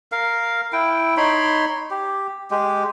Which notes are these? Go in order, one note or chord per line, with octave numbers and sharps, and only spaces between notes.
A#4 F5
E4 G5
D#4 C#5 B5 C6
G4
G#3 G4